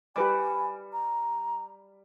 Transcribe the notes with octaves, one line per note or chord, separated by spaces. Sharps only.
G3 G4 B4 G#5 D6
A#5